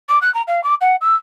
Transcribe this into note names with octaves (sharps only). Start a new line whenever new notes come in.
D6
F#6
A#5
F5
D6
F#5
E6